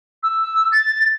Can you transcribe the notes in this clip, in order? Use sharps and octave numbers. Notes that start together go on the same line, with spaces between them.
E6
A6